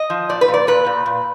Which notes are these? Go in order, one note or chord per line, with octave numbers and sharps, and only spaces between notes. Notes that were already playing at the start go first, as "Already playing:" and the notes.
Already playing: D#5
F3
A#2 D5
B4
A#2
D5
A#2 B4
A#2
A#2